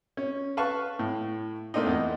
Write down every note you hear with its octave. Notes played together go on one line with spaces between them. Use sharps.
C#4
B4 F5 A5 C#6
A2
A3 A#3 C4 D4 D#4
E2 D#5